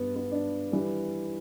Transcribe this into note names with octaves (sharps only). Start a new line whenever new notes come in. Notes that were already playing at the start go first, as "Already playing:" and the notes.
Already playing: G2 B3
B3
D4
E3 G3